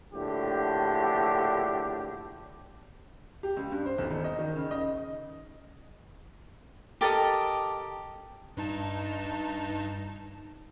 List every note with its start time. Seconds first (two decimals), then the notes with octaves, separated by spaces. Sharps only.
0.13 A#1 A2 D3 G4
3.43 G4
3.57 C#2
3.72 G2
3.86 C5
3.98 B1
4.10 D#1
4.24 D#5
4.39 D#3
4.56 C#3
4.71 D#5
7.01 G4 A4 A#4 D#5
8.57 G2 D#4 A5